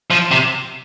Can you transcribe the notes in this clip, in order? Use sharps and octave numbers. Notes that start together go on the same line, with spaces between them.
F3
C3